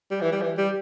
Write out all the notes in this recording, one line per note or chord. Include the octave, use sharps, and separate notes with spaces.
G3
E3
G3
E3
G3